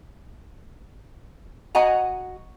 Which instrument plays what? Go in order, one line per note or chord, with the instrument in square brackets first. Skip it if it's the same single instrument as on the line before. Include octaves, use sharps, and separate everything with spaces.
[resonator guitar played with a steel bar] F#4 D#5 F#5 G#5 A#5